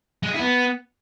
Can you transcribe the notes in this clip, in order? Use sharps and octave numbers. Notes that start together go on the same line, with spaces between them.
G#3
G#4
E4
B3